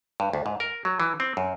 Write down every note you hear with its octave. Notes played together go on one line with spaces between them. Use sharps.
G2
D2
G#2
A#4
F#3
E3
C4
F#2